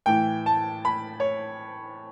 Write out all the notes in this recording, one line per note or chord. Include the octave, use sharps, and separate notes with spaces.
A2 E3 G5
A5
B5
C#5